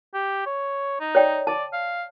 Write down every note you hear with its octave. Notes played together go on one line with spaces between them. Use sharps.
G4
C#5
D#4
C#5 D5 G5
D5 A5
F5